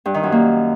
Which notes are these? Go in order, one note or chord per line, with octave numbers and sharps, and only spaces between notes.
G2
D#3
F#2
A#3